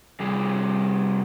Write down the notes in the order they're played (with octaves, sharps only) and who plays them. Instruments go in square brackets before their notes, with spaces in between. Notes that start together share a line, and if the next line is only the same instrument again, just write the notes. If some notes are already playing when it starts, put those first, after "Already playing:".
[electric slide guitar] C3 G3 G#4